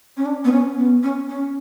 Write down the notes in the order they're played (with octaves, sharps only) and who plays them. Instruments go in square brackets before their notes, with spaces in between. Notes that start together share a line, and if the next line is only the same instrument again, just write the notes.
[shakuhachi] C#4
D4
B3
C#4
B3
C#4
C#4